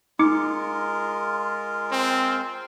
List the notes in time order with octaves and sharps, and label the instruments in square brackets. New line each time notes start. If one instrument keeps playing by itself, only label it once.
[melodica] G#3 F4 A#4 [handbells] D#4 D6 C#7
[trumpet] C4